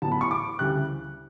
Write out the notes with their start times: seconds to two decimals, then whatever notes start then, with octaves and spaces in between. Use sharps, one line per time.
0.02 A1 A2 F#3 B3 A5
0.12 B5
0.21 C#6
0.31 D6
0.59 D2 C#3 E3 G3 F#6